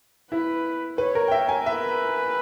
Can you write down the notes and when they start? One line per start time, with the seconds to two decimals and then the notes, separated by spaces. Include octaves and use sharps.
0.31 E4 B4
0.98 B4 C#5
1.15 A#4
1.28 G5
1.32 E5
1.49 G#5
1.66 B4 E5